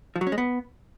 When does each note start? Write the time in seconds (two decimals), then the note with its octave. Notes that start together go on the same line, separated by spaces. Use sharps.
0.16 F3
0.21 F#3
0.27 C#4
0.32 G#3
0.38 B3